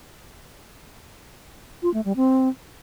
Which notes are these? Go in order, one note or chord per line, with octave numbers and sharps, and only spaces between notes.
F4
A3
G3
C4